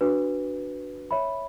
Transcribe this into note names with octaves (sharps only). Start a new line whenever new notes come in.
D4 F#4 B4
C#5 E5 B5